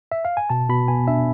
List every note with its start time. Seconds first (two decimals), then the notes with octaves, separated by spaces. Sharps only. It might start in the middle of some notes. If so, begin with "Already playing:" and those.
0.12 E5
0.25 F5
0.37 G#5
0.50 B2 A5
0.69 B2 B5
0.88 B3 G#5
1.07 D4 E5